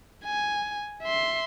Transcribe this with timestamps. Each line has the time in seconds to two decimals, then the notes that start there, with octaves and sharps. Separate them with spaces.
0.25 G#5
1.03 E5 C6